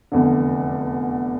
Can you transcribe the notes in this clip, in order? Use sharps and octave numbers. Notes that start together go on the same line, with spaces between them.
F1 E2 D3